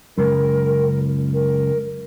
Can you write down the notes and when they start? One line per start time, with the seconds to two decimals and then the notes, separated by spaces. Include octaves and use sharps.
0.18 C#2 F#2 A#4
1.33 A#4